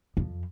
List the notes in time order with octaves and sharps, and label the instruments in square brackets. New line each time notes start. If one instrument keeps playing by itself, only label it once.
[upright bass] F2